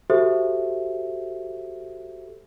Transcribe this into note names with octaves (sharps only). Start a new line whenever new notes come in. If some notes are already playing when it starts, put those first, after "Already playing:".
F#4 G4 A4 C5 E5